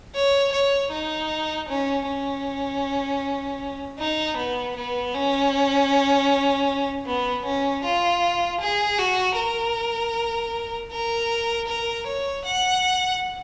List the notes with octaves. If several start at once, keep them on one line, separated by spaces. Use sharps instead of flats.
C#5
C#5
D#4
C#4
C#4
D#4
B3
B3
C#4
B3
C#4
F4
G#4
F#4
A#4
A#4
A#4
C#5
F#5